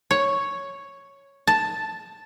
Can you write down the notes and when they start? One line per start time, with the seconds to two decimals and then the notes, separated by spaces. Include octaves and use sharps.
0.11 C#5
1.47 A5